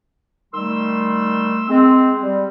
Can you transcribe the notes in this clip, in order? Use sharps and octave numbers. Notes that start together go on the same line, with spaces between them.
D#3 G3 A3 C6 E6
G#3 C4
G3